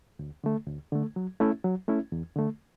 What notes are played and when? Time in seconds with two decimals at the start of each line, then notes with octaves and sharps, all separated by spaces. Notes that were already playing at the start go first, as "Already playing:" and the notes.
0.19 D2
0.44 D3 A3
0.68 D2
0.92 D3 A3
1.16 F#3
1.40 A3 C#4 E4
1.64 F#3
1.88 A3 C#4 E4
2.12 E2
2.36 D3 A3